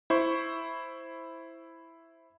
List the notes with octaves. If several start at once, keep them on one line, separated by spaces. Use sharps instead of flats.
E4 C5 C#6